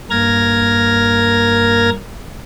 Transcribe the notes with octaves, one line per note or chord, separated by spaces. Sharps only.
G2 A#3 A#4 F6 G#6 A#6